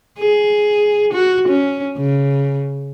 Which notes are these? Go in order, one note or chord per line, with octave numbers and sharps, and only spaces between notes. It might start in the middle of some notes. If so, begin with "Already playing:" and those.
G#4
F#4
C#4
C#3